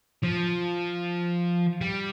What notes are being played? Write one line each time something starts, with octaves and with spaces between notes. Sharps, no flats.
F3
G3